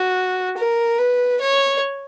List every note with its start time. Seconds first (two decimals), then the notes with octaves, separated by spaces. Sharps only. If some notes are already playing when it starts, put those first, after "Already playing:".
Already playing: F#4
0.57 A#4
0.98 B4
1.41 C#5